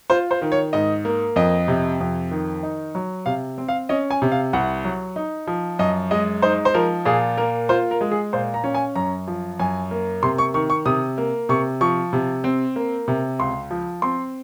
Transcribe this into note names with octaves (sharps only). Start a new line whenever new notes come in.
F4 C5
C5
D#3
C#5
G#2 D#5
A#3
F2 D#5
C3
F2
D#3
D#4
F#3
C3 F5
C4
F5
C#4 D#5
G#5
C3
F5
C2 F#5
F#3
D#4
F3
F#2 D#5
G#3 D#5
D#4 C5
C5
F3 A#4
A#2 G#4
A#3 A#4
F4 C5
A#4
G#3
G#4
A#2 C5
A#5
C#4
G#5
F#2 A#5
F3
F#2 G#5
A#3
C3 C6
C#6
D#3 C#6
C#6
C3 D#6
A#3
C3 C#6
F3 C#6
C3
C4
A#3
C3
C#2 C6
F3
C4 C6